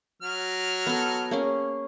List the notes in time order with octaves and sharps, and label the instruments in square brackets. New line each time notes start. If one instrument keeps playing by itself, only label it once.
[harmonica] F#3 F6
[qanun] B3 A4
A#3 C#4 G#4